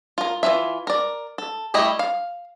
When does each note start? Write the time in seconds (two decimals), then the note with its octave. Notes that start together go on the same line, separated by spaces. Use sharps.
0.18 F4 A#4
0.43 E3 C4 F4 E5
0.87 A#4 D5
1.38 A4
1.74 G3 A3 E4 G4 D#5
1.99 F5